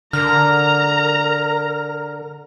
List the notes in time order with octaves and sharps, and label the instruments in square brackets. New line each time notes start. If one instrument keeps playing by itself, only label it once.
[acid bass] D3 [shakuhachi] A#4 [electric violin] A#5 [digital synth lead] F6